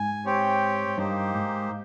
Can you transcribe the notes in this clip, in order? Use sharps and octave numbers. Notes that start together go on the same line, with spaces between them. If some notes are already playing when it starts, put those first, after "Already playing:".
Already playing: G#2 G#5
C4 G4 C#5 G5
G2 A#3 D#4 G4 C5
G#2